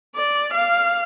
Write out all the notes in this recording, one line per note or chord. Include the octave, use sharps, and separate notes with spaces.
D5
F5